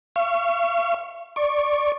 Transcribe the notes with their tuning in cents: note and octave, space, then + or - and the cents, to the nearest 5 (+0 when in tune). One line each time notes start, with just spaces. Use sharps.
F5 -40 C#6 +0
D5 +0 C#6 -15